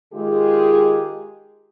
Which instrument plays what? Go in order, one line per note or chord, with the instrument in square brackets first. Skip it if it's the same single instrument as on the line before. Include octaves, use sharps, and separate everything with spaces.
[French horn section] D#3 G#3 F4 G4 G#4